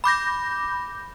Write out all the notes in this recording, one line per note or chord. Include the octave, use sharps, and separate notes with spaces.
B5 D6 G6 A#6